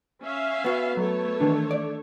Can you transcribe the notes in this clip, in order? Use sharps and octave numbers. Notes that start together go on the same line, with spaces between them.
C#4 E5 F5
B3 F#4
F#3 A3 A4 C#5
D#3 E3 D4
D5